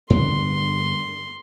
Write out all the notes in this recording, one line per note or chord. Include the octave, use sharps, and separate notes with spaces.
G2 D3 B3 C6